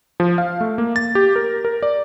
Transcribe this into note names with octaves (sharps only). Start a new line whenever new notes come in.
F3
F5
A3
A#3
A6
G4
A#4
A#4
D5